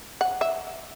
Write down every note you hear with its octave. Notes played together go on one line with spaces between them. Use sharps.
F#5
E5